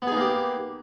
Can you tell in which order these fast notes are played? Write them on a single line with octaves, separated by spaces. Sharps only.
B3 G#4 D#4 A#3 G4